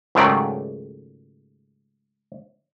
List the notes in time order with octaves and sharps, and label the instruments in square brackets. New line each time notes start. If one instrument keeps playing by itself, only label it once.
[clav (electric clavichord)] C#2 G#2 D#3 F#3 A3 D5